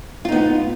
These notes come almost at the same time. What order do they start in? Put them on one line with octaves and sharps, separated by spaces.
F4 D#4 B3